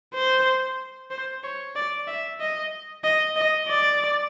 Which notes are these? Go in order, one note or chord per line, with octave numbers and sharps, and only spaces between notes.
C5
C5
C#5
D5
E5
D#5
D#5
D#5
D5